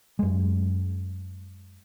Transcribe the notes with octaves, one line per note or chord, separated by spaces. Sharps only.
F#2 G#3